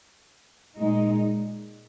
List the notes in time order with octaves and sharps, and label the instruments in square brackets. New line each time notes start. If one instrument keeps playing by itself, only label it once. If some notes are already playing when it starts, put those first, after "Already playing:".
[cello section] A#2 G#3 D#4